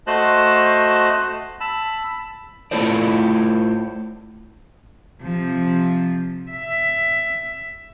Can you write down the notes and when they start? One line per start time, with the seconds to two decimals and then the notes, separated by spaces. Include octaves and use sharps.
0.07 A3 F#4 C5 D#5 A5 F#6
1.60 A5 B5 E6
2.71 A3 E4 F4 A4 C5 D5
5.22 C3 F3
6.51 E5